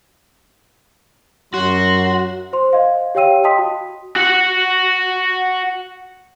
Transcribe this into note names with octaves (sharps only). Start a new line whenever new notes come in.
F#2 F#3 F#4 C6
C5 C6
D#5 F5
G4 C#5 F5 G5 E6 D#7
D#5 G5 A5 C6 D#6 B6
F#4
F#4 F#5